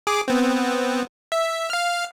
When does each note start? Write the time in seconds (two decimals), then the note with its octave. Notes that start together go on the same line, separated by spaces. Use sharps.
0.07 G#4 D6
0.28 B3 C4
1.32 E5
1.70 F5 F6